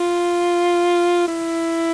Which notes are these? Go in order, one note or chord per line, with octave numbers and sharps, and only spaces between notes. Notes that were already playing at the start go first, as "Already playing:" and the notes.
Already playing: F4
E4